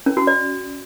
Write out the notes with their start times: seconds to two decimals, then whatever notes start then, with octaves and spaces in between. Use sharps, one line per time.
0.06 C#4
0.17 F#4
0.27 D5